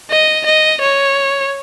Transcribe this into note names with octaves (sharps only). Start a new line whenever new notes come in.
D#5
D#5
C#5